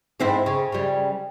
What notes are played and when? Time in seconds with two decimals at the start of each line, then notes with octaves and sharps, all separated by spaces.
0.20 G#2 C4 E4
0.46 C#3
0.72 C#3 G3